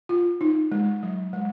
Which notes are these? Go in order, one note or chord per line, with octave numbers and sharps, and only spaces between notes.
F4
D#4
G#3
F#3
G#3